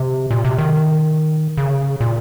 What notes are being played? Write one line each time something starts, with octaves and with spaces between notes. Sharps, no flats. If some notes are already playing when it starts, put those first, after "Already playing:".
Already playing: C3
A#2
C3
D#3
C#3
A#2